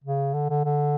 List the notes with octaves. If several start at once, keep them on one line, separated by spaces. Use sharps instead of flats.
C#3
D3
D3
D3